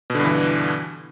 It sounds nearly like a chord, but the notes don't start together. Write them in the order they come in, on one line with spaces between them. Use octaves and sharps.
B2 D3 G2 E3